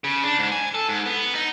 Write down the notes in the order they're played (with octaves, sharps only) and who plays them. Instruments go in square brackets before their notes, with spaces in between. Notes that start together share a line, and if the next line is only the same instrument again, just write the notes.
[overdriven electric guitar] C#3
D4
G#2
G#5
A4
G#2
B3
D#4